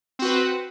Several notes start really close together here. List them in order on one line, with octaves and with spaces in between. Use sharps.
C4 F#4 B4